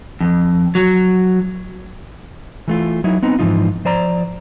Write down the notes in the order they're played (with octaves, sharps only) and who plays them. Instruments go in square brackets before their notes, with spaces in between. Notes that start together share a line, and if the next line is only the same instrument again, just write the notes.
[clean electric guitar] F2
F#3
[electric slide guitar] E3 A3 F4
F#3 D#4 E4
B3 C4 D#4
G#2 E3 F3 D#4 F4
F3 C5 D5 A#5